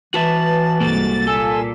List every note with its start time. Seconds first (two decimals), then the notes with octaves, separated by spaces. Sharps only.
0.14 E3 F#4 B4 E5 A5
0.80 C2 G#2 A#3 F#4 A4 A6
1.27 A#2 A4 G#5 A5 E6